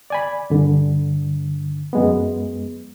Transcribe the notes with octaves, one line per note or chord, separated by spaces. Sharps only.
D5 G#5 B5
G2 D3
F#2 G#3 B3